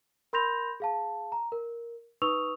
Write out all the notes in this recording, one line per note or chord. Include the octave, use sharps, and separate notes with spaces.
A#4 B5 C6 G6 A#6 F7
G#4 F5 A5
A#5
A#4
D#4 B4 C#6 D#6 E6 F7